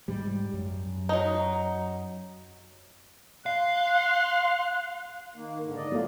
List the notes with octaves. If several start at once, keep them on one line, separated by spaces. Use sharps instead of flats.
G#2 G3
F#2
F#3 D#4
F5 C6 F#6
D#3 A#3
G#2 D3
D5 D#5
F#3 A3 F4